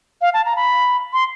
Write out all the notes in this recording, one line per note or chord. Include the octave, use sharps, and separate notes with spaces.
F5
A5
A#5
B5
C6